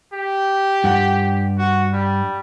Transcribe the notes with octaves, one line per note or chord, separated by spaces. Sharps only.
G4
G2 F#5
F#4
G3